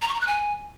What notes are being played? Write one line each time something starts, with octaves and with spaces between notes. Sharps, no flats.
A#5
C#6
A#5
F#6
G#5